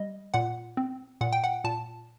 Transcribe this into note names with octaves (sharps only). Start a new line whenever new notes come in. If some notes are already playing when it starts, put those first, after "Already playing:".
Already playing: G3 D#5
A#2 F#5
C4
A#2 F#5
G5
F#5
A#2 A5